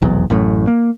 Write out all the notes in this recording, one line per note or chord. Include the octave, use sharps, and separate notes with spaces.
F1 B1 E2
A1 F#2 A2
A#3